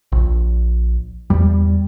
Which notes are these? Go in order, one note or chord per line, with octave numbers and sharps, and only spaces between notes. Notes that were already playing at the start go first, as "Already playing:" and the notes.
A#1
E2 G3